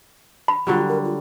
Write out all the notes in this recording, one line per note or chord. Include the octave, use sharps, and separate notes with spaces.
B5
D3 F#3 G3 F4
A#4
F4